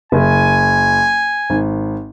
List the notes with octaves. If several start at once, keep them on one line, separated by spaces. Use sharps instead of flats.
F#1 G#5
G#1